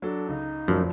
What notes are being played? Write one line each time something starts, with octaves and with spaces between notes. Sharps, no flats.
F#3 D4 A4
C#2 D#4
F1 F#2 F3